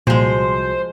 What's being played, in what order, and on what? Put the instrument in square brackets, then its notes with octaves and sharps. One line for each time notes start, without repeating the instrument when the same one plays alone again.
[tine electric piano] C2 F#4 [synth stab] A#2 [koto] F3 G#3 [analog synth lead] C5